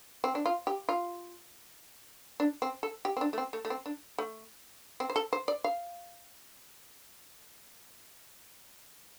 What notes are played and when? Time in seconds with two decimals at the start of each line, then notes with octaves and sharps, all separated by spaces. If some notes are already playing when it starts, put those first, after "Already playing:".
0.24 C4
0.35 D4
0.46 F4
0.67 G4
0.89 F4
2.40 D4
2.62 C4
2.83 A4
3.05 G4
3.17 C4
3.21 D4
3.33 A3
3.38 C4
3.53 A3
3.65 A3
3.70 C4
3.86 D4
4.18 A3
5.00 C4
5.10 C5
5.16 A4
5.33 C5
5.48 D5
5.64 F5